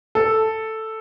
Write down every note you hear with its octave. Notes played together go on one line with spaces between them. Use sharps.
A4